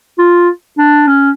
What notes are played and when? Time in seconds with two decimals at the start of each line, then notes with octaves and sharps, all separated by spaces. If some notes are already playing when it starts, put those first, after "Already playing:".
0.18 F4
0.78 D4
1.07 C#4